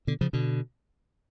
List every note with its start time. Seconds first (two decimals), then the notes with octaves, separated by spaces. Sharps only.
0.07 B2 D3
0.21 C#3 F3
0.33 B2 D3